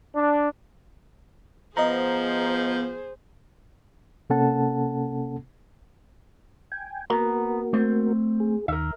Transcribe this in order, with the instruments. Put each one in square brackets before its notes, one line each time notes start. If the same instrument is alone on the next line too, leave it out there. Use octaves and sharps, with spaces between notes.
[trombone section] D4
[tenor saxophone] F3 [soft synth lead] B3 [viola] G#4 C5 [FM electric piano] D#5 A#5
[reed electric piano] C3 A#3 C#4 A4 F#5 A5
[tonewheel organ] G5 G#5
[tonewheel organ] A#3 F#4 A#4 [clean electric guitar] B3 A#5
[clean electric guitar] A3 C4 C5
[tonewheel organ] G#4
[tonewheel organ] D#2 D#3 [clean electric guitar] A#4 E5